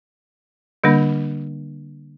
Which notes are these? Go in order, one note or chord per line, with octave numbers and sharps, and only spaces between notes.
D3 G3 A#3 D4